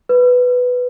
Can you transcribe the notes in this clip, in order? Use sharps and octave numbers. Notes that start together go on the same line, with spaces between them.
B4